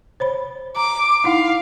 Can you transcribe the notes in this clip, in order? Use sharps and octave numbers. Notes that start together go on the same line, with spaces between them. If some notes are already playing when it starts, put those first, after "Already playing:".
C5 C#5 B5
A#5 D6
D#4 E4 F5 F#5